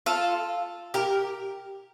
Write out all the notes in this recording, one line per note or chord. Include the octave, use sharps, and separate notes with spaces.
F4 A4
G4 A#4